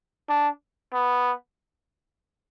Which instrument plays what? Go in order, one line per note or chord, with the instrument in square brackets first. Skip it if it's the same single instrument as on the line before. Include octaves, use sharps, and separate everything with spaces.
[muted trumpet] D4
B3